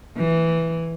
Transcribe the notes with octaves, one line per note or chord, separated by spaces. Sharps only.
E3